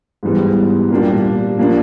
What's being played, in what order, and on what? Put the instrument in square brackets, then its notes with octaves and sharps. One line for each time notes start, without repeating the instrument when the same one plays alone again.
[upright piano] G#2 E3 G3 B3
A#2 G3 A#3 D4 G4
F3 A#3 D4